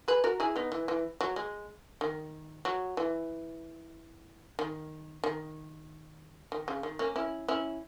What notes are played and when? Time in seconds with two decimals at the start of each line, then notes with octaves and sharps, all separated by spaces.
0.08 G#4 B4
0.24 F#4 A#4
0.40 E4 G#4
0.56 B3 D#4
0.72 E3
0.88 E3
1.21 F#3
1.36 G#3
2.01 D#3
2.65 F#3
2.97 E3
4.59 D#3
5.24 D#3
6.52 D#3
6.68 C#3
6.83 D#3
6.99 A#3 C#4
7.16 C#4 E4
7.48 C#4 E4